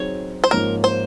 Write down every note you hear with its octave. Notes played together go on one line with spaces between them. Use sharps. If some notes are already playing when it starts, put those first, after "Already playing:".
Already playing: F#3 C4 D#4 G#4 C#5
C5
G#2 F3 A#3 C#4 A#4
C5